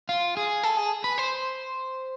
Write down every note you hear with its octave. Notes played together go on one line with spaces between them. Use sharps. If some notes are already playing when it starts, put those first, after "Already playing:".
F4
G#4
A4
G#4
B4
C5